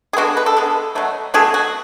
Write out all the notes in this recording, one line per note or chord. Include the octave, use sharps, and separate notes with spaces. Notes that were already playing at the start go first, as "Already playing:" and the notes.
G#4
D3 G#3 B3 F#4
B4
A4
D3 G#3 B3
B2 F#3 A3
B2 F#3 A3 G#4
F#4